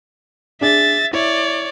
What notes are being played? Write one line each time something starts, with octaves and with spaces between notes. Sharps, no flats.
D4 G#4 E5 A6
E4 C#5 D5